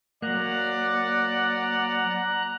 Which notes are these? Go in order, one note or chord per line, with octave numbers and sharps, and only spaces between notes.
F#3 A#3 D5 F#5 A#5 F#6